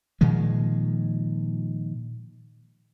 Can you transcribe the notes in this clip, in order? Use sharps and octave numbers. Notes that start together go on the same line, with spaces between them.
A#2 D#3 F3 G#3